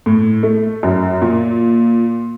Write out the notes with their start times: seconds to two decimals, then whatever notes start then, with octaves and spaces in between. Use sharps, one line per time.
0.06 A2
0.43 A3
0.83 F#2
1.22 A#2